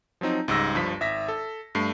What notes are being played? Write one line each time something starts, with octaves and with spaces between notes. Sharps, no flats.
F3 F#3 C4 D#4
C#2 G#2 G3 E6 A#6
G1 G2 F3 B6
G#1 E5 A#6 B6
A4
G2 A3 C7